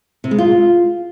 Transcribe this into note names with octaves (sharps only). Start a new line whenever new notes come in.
C3
G#3
F4